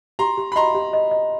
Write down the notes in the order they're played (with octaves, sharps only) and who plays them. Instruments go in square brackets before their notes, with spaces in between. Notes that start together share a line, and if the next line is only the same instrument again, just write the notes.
[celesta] G4 [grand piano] A#5 C6
[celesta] G4
[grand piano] B5
[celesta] D#5 [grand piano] A#5 C6
[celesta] G4
D#5
D#5